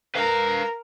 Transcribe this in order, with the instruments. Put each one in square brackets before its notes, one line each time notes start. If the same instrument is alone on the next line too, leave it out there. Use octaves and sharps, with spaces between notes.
[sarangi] A#4 [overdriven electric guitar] B4 F5